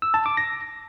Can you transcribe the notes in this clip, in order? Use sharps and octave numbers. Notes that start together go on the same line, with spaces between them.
E6
A5
D6
A#6